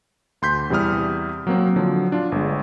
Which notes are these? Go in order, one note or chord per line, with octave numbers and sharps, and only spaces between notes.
D2 C6 G6 B6
E2 C3 G3 E4 D#6 F6
F#3 A#3 C4
D3 F3 F#3
D4 F4
G1 G#3